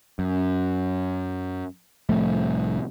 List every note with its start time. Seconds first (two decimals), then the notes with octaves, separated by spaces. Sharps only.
0.19 F#2
2.09 C2 A2 F3 A3